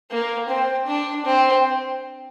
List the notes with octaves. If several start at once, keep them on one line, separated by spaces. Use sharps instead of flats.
A#3
C4
D4
C4